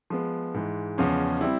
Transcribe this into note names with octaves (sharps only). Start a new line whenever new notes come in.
F3 G#3 B3
G#2 E3 G#3
E2 C#3 F3 G#3 C#4
G3 C4 E4